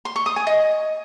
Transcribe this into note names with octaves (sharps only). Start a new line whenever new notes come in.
C6
C#6
D#6
G#5
D#5